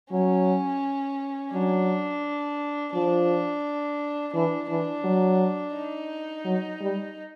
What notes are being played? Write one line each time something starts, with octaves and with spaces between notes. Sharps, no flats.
F#3 C#4
F#3 D4
F3 D4
E3 D4
E3 D4
F#3
D#4
F#3
G3